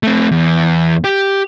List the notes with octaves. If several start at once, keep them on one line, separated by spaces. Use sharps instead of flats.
A3 C4
E2
G4